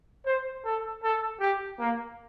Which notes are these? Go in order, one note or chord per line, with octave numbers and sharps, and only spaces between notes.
C5
A4
A4
G4
A#3